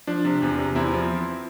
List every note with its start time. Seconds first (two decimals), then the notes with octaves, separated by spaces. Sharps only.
0.07 F3 D4
0.25 C3
0.42 E2
0.59 C3
0.75 E2 C4 E4
0.93 F3